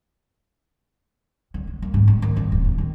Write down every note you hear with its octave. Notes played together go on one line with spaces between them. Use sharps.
D3
G#3
A#3
G#2
D4
D#3
F#1
D#1
G2
D#3